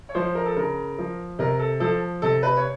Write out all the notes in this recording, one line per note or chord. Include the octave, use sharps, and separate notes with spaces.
C#5
F3 C5
A#4
A4
C#3 A#4
F3
C3 A#4
A4
F3 A4
C3 A4
B4
C#5